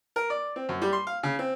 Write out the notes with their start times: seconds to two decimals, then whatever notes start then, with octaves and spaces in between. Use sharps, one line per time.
0.16 A#4
0.30 D5
0.56 C4
0.69 F#2
0.82 G3
0.93 C6
1.07 F5
1.23 C#3
1.39 C4